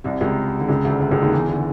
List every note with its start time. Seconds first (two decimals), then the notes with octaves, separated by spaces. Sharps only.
0.04 C2 C3
0.21 C#2 C#3
0.61 D3
0.69 C#2 C#3
0.85 D2 D3
1.00 D2 D3
1.11 C#2 C#3
1.22 D#2 D#3
1.33 E2 E3
1.49 D3